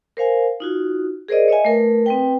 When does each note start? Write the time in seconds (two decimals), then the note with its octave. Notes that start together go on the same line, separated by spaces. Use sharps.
0.17 A#4 C5 F5 G#5
0.60 D#4 F4 F#4
1.28 G#4 A#4 C5 D5 D#5
1.48 C#5 D#5 E5 G#5
1.65 A3 A#4 B4
2.06 C4 B4 G5